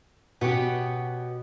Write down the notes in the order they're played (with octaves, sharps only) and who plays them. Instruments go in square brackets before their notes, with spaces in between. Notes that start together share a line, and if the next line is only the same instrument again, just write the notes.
[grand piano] B2 [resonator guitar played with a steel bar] B3 C#4 G4